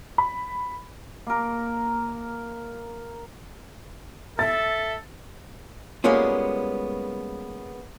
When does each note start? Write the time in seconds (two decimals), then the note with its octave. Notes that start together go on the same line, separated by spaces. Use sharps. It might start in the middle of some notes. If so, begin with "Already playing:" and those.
0.18 B5
1.27 A#3 A#4
4.39 A4 E5 A6
6.04 G3 G#3 A#3 B3 C#4 F4